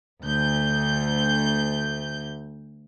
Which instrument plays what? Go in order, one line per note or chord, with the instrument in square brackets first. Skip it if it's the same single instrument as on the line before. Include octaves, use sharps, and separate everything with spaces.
[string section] D2 G6